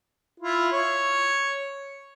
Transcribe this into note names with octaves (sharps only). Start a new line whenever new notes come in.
E4 F4
C#5